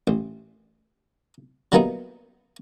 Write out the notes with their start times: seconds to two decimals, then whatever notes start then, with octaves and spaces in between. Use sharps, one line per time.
0.07 A1
1.72 F#3 G3 A#3 B3 D#4 E4